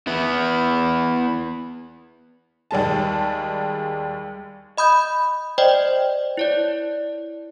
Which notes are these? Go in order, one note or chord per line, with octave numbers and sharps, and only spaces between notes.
B3 E4
D#2 G3 G#3 A5
D#5 B5 D#6 G6
C5 D5 D#5 G5
E4 C#5 D5